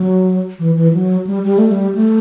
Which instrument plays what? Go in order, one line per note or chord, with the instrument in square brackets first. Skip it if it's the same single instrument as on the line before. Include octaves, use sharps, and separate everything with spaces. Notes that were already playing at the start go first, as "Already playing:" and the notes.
Already playing: [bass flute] F#3
E3
E3
F#3
G3
G3
A3
G3
A3